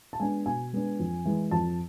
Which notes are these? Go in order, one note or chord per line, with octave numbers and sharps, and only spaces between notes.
A5
G#3 B3 D4 G#5
B2 G#5
G#3 B3 D4
F2
E3 G#3
F2 A5